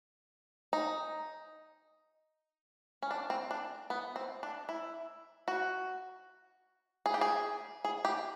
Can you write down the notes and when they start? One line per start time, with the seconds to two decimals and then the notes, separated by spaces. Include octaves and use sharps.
0.73 D#4
3.02 C#4
3.11 D4
3.30 C4
3.51 D4
3.90 B3
4.16 C4
4.43 D4
4.69 E4
5.48 F#4
7.06 G#4
7.14 G4
7.21 G#4
7.85 G#4
8.05 G4